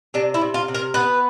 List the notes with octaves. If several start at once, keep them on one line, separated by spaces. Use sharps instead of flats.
C3 D4
E4
C3
F4
C3
A#4
B3 B4